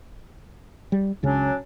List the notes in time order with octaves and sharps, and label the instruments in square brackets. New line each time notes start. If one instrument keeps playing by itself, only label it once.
[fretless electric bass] G3
[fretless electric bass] C#2 C#3 [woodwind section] F#3 C#4 D4